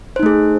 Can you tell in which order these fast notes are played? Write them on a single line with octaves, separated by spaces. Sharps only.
C5 D#4 A3 G#4